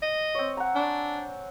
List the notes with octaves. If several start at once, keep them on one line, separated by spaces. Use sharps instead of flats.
D#5
C4 C#5
F#5 G#5 A#5
D4